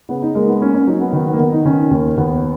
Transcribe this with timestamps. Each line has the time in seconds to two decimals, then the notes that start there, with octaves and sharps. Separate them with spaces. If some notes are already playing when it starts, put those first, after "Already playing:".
0.09 C#3 B3
0.22 D#4
0.35 G#3 A#3
0.48 B3
0.61 A#3 C#4
0.74 C#4
0.87 F#3 D#4
1.00 B3
1.13 D#3 B3
1.26 B3
1.33 A#3
1.39 D#3 B3
1.52 D#4
1.65 D#3 C#4
1.91 D#2 A#3
2.17 D#2 B3